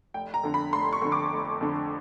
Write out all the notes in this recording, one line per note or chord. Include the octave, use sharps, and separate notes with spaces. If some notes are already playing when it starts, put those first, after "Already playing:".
F1 G5
A#5
F2 D3
B5
F1 C6
C#6
F2 D3
D6
F1
F2 D3